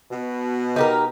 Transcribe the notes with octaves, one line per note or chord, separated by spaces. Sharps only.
B2
D#4 G4 A#4